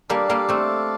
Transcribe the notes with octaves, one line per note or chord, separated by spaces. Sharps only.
G3 A#3 D4 A4 D5 F5
G3 A#3
A3 C4